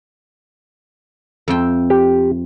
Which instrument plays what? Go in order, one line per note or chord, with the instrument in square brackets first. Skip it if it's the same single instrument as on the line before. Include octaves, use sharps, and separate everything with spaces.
[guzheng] F2 E5 G5
[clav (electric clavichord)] G4